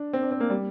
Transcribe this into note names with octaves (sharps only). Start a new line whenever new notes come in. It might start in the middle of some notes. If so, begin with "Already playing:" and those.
Already playing: D4
C4
D4
C4
A#3
G3